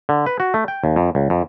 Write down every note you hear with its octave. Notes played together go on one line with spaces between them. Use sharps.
D3
B4
F#4
A3
G5
D#2
F2
C#2
F2